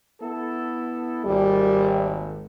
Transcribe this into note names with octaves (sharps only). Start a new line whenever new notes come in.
B3 E4 A4
G#1 D#2 G3